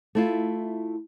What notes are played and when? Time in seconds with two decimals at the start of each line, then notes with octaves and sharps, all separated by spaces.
0.15 A3 E4 F4